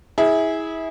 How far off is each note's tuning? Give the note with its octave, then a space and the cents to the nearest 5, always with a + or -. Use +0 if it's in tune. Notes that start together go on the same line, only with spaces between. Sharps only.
E4 -25 G#4 -5